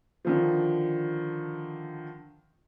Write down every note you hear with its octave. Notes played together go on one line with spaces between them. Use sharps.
D3 D#3 F3